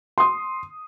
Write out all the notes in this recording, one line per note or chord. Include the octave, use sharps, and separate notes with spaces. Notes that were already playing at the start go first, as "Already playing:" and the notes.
C6 D#6